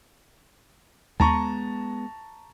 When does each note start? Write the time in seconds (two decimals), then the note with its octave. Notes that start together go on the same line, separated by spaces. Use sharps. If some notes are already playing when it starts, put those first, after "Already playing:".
1.20 D#2 G#3 A3 B3 A5 A#5 C#6